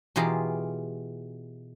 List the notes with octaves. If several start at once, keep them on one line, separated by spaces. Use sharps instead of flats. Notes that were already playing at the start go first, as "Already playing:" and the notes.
B2 E3 F4 G4 G#4 A#5